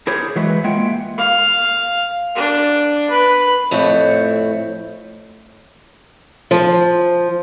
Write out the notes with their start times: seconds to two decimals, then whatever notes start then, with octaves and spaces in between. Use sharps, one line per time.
0.07 E4 G4 G#4 A#4 C5 C#5
0.36 E3 F#3 G#3 F#4 B4
0.64 G#3 A#3 F4 E5 F#5 G5
1.18 F5
2.36 D4
3.10 B4
3.71 F2 A2 A3 C4 C#5
6.51 F3